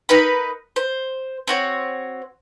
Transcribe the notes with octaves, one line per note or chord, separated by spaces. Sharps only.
D#4 A#4 B4 B5
C5
C4 F#4 C#5